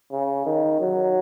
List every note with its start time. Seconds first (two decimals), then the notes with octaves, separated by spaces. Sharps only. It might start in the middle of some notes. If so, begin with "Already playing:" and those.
0.12 C#3
0.46 D#3
0.80 F#3